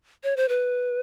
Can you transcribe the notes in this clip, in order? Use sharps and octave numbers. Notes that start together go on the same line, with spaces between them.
C#5
C5
B4